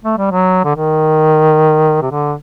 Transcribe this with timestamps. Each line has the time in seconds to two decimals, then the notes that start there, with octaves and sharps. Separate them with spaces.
0.04 A3
0.18 G3
0.31 F#3
0.64 D3
0.76 D#3
2.02 C3
2.10 D3